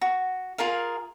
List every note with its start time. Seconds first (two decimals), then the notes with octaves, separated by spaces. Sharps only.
0.01 F#4
0.58 F4 G#4 A#4 F5